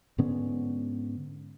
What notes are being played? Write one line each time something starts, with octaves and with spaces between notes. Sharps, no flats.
G#2 D3 B3 C#4